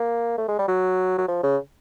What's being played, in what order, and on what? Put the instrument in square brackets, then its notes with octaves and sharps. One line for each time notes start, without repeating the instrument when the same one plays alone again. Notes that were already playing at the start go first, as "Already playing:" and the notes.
Already playing: [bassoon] A#3
A3
G#3
G3
F#3
F#3
F3
C#3